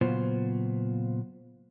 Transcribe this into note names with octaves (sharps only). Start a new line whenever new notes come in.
A#2 C#3 F#3 B3 F4 C5